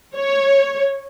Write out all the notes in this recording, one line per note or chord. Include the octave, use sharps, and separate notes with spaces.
C#5